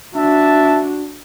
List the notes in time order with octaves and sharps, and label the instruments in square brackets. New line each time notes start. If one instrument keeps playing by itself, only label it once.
[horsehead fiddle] D4 F#4 [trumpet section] E5 A5